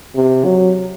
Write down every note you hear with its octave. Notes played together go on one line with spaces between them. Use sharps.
C3
F#3